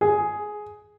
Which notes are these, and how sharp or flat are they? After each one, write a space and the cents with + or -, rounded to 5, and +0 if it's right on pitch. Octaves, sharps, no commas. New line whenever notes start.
G#4 +10